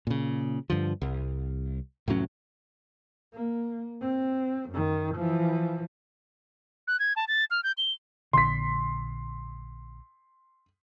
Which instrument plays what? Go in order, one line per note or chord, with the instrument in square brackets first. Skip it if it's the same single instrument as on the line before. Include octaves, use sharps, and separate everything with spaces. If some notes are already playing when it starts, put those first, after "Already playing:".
[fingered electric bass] A#2 C#3
G2 D3 F3
C2
F1 A2 F#3 C#4
[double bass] A#3
C4
F#2 D#3
E3 F3
[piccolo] F#6
G#6
A5
A6
F6
G6
G7
[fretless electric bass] A#1 D3 [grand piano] C6 B6